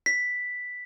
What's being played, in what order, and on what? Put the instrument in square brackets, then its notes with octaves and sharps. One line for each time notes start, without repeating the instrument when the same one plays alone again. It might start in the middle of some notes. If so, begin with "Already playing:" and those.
[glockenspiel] B6